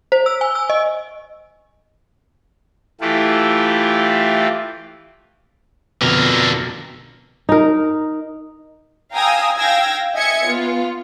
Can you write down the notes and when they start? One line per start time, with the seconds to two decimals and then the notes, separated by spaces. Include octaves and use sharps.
0.12 C5
0.26 E6
0.41 G#5
0.55 E6
0.70 D#5
3.01 E3 A3 E4 F4 G4
6.01 F2 B2 D3 A#4
7.49 D#4 A#4
9.13 F5 G5 G#5 A#5 D#6 E6
9.58 F5 G5 E6 G#6 A#6
10.14 D#5 E5 G#5 G#6 C#7
10.46 B3 F4